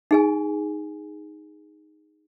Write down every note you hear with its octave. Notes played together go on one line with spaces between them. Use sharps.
D#4 G#4 G#5